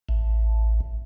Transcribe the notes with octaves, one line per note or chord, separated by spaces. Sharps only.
A1